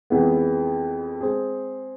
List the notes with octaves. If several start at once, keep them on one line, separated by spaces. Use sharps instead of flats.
F2 E3 G#3 B3
G#3 C4 G#4